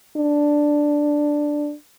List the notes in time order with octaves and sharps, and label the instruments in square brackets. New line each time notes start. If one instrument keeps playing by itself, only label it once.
[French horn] D4